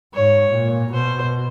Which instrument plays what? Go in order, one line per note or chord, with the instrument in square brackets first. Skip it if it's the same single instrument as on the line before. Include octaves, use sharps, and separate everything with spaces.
[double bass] G#2 [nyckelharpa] C#5
[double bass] A#2
[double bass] B2 [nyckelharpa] C5